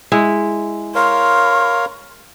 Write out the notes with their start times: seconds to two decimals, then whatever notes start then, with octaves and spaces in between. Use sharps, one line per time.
0.12 G#3 E4
0.95 A#4 C#5 F5 C6